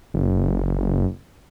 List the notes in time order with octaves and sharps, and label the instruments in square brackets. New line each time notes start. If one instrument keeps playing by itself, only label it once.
[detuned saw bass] F#1